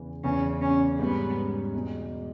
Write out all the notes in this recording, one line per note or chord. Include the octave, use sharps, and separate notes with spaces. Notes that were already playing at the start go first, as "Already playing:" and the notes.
Already playing: E2 C#3 E3
E2 C#3 E3 C#4
C#4
G#2 G3 B3 C#4
E2 B2 G#3 D#4